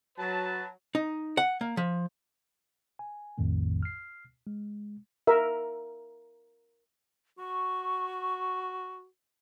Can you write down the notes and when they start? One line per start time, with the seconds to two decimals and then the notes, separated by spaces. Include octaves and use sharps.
0.18 F#3 B4 A5
0.95 D#4
1.37 F#5
1.61 A#3
1.77 F3
2.99 G#5
3.38 A#1 F2 A2 D#3 A3
3.83 F6 C7
4.47 G#3
5.27 A#4 E5
7.39 F#4 C#6